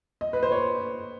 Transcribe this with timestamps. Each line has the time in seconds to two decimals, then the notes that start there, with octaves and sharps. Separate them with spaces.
0.21 D#5
0.33 B4
0.43 C5
0.52 C#5